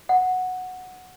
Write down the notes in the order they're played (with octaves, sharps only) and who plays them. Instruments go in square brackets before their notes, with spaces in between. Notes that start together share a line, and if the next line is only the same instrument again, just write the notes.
[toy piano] F#5